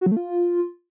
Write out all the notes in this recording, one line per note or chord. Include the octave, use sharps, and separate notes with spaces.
F#4
F#3
A3
F4